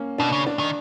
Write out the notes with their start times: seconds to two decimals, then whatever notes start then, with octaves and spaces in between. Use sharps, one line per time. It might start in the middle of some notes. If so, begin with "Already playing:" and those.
Already playing: A#3 C#4
0.18 B2 D4
0.32 C#3
0.47 D4
0.59 D#3